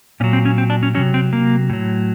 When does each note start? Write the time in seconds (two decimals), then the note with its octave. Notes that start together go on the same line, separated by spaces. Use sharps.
0.20 A#2 C#4
0.24 F#3
0.33 C4
0.45 C#4
0.58 C4
0.70 D4
0.83 C#4
0.95 C3 D#3 F#3 C#4
1.14 C4
1.33 A#3
1.70 A2 F#3